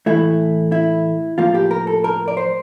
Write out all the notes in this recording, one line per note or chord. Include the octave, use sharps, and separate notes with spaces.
A2 E3 A3 E4
E4
A2 F3 A#3 F4
G4
A#4
A4
A#4
D5
C5